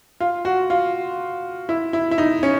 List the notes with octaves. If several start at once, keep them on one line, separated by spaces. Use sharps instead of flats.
F4
F#4
F4
E4
E4
E4
D#4
C#4